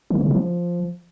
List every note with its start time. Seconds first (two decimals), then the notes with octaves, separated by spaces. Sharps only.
0.10 D#3
0.21 C#3
0.31 F3